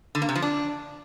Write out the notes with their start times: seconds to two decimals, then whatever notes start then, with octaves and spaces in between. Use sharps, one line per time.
0.15 D3
0.22 A#3
0.29 C3
0.35 F3
0.42 D4